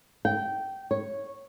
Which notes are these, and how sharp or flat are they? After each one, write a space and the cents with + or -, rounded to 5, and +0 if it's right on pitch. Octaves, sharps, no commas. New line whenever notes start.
G5 -20
C#5 -5